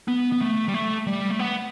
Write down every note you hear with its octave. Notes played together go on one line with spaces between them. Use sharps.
B3
B3
A3
G3
A3
G3
A3
B3